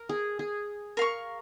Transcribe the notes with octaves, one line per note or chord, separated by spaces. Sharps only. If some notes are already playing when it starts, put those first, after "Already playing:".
Already playing: A#4
G#4
G#4
A#4 F5 C#6